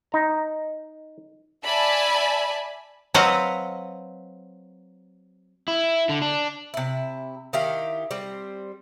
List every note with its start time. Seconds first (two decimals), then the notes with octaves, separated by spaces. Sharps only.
0.12 D#4 A#5
1.64 D5 E5 G#5 A5 B5
3.14 F#3 C4 B4 D#5 F5 F#5
5.68 E4
6.09 D3
6.22 D4
6.74 C3 E4
7.53 D#3 E4 G4 F5
8.11 G3 C4